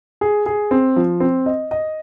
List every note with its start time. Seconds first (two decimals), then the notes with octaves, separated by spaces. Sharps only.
0.21 G#4
0.46 G#4
0.71 C4
0.96 F3
1.20 C4
1.46 D#5
1.71 D#5